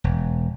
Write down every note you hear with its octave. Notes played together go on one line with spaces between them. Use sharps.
E1